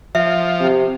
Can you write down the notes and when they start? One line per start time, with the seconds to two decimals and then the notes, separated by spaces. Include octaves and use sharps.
0.15 F3 E5
0.60 C3